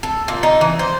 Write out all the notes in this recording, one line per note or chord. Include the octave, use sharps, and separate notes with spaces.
A4
A#2
D#4
E3
C5